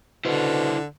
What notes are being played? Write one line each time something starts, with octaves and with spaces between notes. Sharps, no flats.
B2 D3 E4 C5